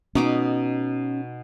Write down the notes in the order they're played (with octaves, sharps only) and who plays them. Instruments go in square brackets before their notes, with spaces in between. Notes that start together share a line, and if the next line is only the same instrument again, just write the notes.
[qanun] B2 D#4 D6 [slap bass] C#4